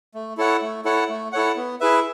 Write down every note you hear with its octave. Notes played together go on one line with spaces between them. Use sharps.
A3
E4 A4 C#5 F#5
A3
E4 A4 C#5 F#5
A3
E4 A4 C#5 F#5
B3
E4 G#4 B4 E5